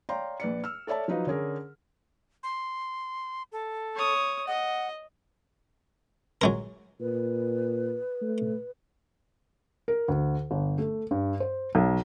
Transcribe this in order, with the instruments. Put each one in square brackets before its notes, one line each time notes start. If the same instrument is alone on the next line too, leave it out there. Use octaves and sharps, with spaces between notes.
[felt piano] C#5 D5 F5 G5 A#5 C6
A#1 B4 D5 C#7
E6 F6
A4 C#5 D5 E5 A5
F3 F#3 D#4 B4 D#5 F5
D3 C#4 G#4 A#4
[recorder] C6
A4
[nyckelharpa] C#5 D#6
[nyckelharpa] D#5 [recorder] F#5
[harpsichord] F#3 G#3 A#4
[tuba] A#2 [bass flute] B4
[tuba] A3
[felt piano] A#4
D2
G1
A3
G2
C5
B1